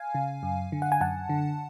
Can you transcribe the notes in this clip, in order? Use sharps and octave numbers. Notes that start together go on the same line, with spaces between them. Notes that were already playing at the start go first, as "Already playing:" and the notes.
Already playing: F5 G#5
C#3
F#2
D3
F#5
G#5
F#2 F#5 A5
D3